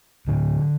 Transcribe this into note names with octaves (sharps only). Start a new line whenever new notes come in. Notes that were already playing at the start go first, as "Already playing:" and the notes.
A2 D3